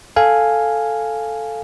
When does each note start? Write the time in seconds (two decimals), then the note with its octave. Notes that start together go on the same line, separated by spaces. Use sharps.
0.16 A4 F5 G#5